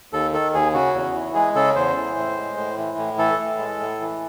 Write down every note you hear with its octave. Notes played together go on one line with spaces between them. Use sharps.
D#2 A4
D#3 A4
D#2 G#4
C#3 F#4
E2
E3
G#3 G#4
C#3 A4
E2 C5
E3
A2
G#3
A2
E3
A2
E3 A4
A2
G#3
A2
E3